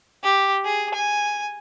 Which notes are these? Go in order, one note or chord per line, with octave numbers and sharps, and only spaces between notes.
G4
G#4
G#5